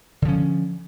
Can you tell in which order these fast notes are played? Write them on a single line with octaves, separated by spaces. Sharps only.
D3 F3 C#4